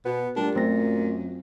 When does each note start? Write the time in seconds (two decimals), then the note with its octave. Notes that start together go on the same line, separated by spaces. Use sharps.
0.05 B2 B3
0.36 A#2 G3 A3 D4 G4
0.55 F#2 F#3 A3 C4 F4 A#6